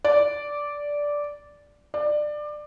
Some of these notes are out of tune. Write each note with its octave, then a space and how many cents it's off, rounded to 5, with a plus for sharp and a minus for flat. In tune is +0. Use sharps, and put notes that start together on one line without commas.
D5 -10
D5 +20